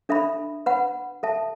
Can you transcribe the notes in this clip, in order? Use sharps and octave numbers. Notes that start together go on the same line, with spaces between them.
D4 A4 E5 B5
B4 F#5 B5
A4 E5 A5